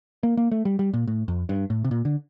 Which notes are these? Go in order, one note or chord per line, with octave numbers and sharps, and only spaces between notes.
A#3
A#3
A3
G3
G3
A#2
A2
F2
G2
A2
C3
A#2
D3